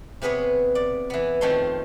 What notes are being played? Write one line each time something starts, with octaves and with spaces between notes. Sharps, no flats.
C3 B3 G#4 B4 C#5
D5
E3 B3
F2 D#3 F3 A3 C#5 C6